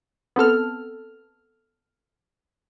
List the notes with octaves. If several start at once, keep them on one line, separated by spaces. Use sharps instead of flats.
B3 C4 A4 F6